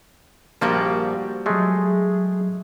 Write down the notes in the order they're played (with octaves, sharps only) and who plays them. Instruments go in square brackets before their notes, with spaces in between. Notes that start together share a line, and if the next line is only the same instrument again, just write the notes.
[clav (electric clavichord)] A#1 F3 A#3 [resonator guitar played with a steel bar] G3 F#4 G4
[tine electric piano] F#3 E5 [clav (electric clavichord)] G#3 A3 [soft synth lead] G#4